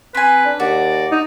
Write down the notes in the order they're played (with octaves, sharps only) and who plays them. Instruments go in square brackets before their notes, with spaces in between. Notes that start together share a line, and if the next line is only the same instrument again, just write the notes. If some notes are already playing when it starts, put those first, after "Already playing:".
[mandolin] C4 G#5 [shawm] B4
[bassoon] D4
[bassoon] D#2 [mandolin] F#4 [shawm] D5
[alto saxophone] D#4